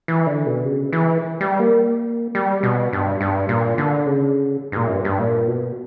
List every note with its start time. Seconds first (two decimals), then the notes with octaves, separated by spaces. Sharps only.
0.08 E3
0.27 D3
0.46 B2
0.65 C#3
0.93 E3
1.41 G3
1.59 A#3
2.35 G3
2.63 B2
2.93 G2
3.21 G2
3.49 A#2
3.78 D3
4.06 C#3
4.72 G2
4.76 A#2
4.87 F#2
4.92 G2
5.05 G2
5.19 A#2
5.47 B2